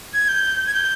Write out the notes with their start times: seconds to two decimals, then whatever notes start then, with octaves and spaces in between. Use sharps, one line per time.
0.14 G#6
0.28 G6
0.67 G#6
0.74 G6